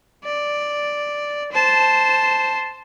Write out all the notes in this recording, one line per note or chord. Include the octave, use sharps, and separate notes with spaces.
D5
C5 A5